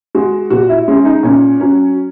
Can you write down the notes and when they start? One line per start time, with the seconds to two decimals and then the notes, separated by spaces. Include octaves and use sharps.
0.15 G#3 F#4
0.50 A#2 F#4
0.69 E4
0.88 G#3 C#4
1.05 D#4
1.23 A#2 C#4
1.60 F#3 C#4